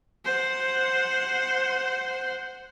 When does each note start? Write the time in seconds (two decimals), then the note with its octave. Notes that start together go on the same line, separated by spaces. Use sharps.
0.25 C5 F#5